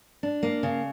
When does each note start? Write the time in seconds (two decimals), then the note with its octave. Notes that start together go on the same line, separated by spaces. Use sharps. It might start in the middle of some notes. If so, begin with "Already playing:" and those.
0.23 D4
0.43 A#3
0.63 C#3